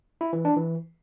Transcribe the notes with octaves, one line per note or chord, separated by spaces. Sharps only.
E4
E3
D4
E3